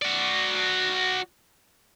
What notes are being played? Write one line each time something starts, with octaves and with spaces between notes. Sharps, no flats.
F#4 D5